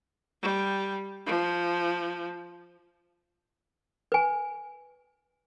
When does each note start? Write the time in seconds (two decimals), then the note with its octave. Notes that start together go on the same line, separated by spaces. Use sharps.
0.43 G3
1.27 F3
4.12 B4 G#5